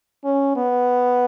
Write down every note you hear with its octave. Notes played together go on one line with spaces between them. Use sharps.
C#4
B3